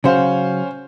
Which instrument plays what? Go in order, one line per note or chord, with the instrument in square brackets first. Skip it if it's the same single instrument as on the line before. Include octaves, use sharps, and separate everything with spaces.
[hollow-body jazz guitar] C#3 F#3 F#4 [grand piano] C#4 C5 F5